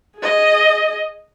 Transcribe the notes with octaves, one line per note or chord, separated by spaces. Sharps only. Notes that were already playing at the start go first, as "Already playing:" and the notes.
G#4 D#5